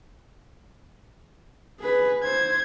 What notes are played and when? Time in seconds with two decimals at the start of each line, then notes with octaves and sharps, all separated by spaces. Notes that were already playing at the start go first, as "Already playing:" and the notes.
1.80 G#4 B4
2.23 C5 G#6